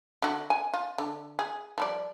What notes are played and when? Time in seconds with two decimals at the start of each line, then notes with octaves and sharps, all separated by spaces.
0.22 D3 F#4
0.50 G#5
0.74 F4
0.98 D3
1.39 G#4
1.78 F3 G3 D5